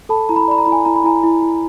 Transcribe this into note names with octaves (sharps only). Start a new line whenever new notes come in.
A4 A5 B5
E4 A#5
B5
A#5
D5 B5
A#5
E4 B5
G#5 A#5
E4 A#5
B5
E4 G#5 A#5
E4
E4